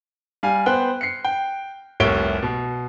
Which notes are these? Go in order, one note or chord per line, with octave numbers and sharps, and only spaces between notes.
G3 F5 G#5
B3 C5 G5 F#6
C7 C#7
G5
F1 C2 C#5 E5 D7 G7
B2